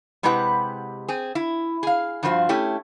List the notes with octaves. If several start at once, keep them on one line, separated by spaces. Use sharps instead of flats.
C3 G#3 E4 G4 B4 F#5
C4 G#4
E4
G#4 F5
G2 F3 F4 F#4 C5
A3 C#4 E4 G4